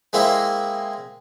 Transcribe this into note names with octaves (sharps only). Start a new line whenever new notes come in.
G#3 A#3 C4 E4